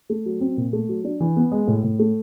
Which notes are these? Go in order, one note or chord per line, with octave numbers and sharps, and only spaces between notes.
A3
F#3
C4
A#2
A3
F#3
D4
E3
B3
G#3
A2
A2
A3